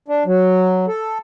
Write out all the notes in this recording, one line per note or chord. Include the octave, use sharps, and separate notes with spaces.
D4
F#3
A4